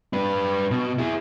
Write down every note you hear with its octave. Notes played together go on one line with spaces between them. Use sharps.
D4 B4
B2
E4 G#4